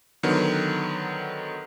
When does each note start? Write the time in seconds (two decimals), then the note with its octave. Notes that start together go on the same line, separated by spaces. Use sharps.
0.23 D3 D#3 F#3 B3